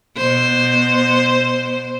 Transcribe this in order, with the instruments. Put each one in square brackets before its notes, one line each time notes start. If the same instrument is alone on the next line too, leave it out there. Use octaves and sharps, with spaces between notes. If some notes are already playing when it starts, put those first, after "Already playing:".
[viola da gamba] B2 C5